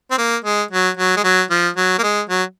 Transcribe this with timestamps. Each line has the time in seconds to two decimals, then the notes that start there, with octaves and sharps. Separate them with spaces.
0.11 C4
0.18 A#3
0.44 G#3
0.71 F#3
0.97 F#3
1.16 G#3
1.24 F#3
1.50 F3
1.76 F#3
1.98 A#3
2.03 G#3
2.29 F#3